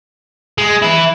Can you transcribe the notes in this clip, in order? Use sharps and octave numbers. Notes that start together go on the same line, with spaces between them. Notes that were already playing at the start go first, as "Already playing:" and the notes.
G#3
E3 E4